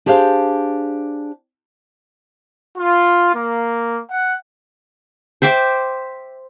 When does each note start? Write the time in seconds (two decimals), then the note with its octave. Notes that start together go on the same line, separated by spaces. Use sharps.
0.06 D4 G4 G#4 C5 F5
2.77 F4
3.33 A#3
4.09 F#5
5.42 C5 E5 G5 D6